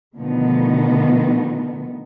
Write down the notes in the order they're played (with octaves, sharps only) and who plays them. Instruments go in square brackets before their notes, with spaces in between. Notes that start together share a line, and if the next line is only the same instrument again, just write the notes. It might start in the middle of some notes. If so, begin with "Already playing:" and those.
[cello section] B2 D3 D#3 F3 A3 B3